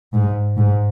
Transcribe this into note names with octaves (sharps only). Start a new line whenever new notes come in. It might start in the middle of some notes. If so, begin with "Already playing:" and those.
G#2
G#2